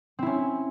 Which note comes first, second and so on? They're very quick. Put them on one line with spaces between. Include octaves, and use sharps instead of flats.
C4 E4 C#4